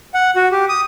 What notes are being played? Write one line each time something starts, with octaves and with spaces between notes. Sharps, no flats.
F#5
F#4
G4
D#6